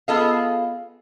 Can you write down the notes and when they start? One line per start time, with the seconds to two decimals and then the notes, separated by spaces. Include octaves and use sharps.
0.08 B3 F4 G#4 A4 D#5 F5